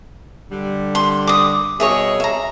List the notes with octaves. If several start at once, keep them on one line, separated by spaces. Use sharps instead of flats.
D3 G3
C6
D6 D#6
B2 G3 G#4 C#5 D#5 E5
E5 A#5